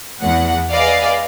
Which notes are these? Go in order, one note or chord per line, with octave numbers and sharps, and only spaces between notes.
E2 F#5
G#4 B4 D5 D#5 F5